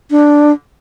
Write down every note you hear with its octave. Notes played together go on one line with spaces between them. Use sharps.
D4